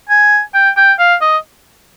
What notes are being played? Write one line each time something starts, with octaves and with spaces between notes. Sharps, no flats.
G#5
G5
G5
F5
D#5